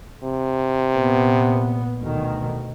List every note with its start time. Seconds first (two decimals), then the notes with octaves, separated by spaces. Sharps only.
0.24 C3
0.93 A#2 B3
2.00 D2 B2 D#3